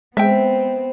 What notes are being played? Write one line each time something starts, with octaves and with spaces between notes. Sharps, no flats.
G#3 B3 C4 E5 G5